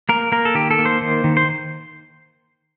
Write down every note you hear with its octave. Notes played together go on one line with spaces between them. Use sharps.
A#3 A#4
A#3 A#4
A4
D#3 G4
A4
A#3
C5
D#3
D#3
C5